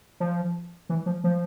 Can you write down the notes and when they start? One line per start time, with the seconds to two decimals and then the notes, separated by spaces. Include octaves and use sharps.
0.20 F3
0.89 E3
1.06 F3
1.24 F3